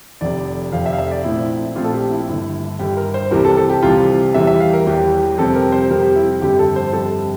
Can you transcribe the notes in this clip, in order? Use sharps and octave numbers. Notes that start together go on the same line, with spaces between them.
F1 F2 C3 D5
F1 F2 C3 F5
E5
F5
E5
D5
A#1 A#2 A3 C4 E4
A#1 A#2 A3 C4 F4
A4
G4
E4
G1 G2 D3
G1 G2 D3 G4
A#4
C5
C2 C3 E3 G3 C4 A#4
A4
A4
G4
C2 C3 E3 G3 C4 F4
E1 E2 E3 G3 E5
E5
F5
A#4
E1 E2 E3 G3 G4
F2 C3 G3 C4 A4
A#4
C5
F2 C3 G3 C4 A#4
G4
E4
G1 F2 D3 G3 G4
A4
C5
G1 F2 D3 G3 A4